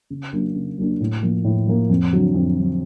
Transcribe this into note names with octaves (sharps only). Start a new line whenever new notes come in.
C#3
F#3 A#3 D4
C#3
F#3 A#3 D4
A2
F3 A#3
A2
F3 A#3
F2
D3 F#3
F2
D3 F#3